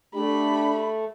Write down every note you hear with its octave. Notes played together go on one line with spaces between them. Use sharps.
A3 D4 G4 B5